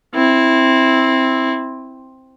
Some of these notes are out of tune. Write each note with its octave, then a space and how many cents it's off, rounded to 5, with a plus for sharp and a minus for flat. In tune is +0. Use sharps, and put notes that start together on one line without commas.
C4 +5 E4 -10